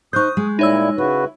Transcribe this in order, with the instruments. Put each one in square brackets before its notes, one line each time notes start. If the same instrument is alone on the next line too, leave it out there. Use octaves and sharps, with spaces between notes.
[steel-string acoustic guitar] D#4 C5 [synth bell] C#6 F#6 G6 [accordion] D#6
[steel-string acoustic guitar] G#3
[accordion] A#2 G3 E4 [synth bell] D#4 C#5 E6
[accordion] C#3 F#4 B4 [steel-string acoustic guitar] E4